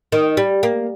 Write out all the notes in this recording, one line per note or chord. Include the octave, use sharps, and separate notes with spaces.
D#3
G3
A#3